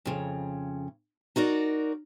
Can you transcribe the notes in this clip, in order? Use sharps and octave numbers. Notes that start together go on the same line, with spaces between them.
F2 C#3
D#4 F#4 A#4 D5